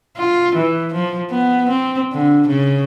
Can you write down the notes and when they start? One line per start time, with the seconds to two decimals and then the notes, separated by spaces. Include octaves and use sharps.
0.18 F4
0.56 E3
0.94 F3
1.30 B3
1.70 C4
2.13 D3
2.48 C#3